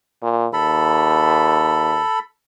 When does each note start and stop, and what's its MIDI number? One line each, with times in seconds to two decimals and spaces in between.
0.23 0.47 46
0.53 2.00 39
0.53 2.19 69
0.53 2.19 83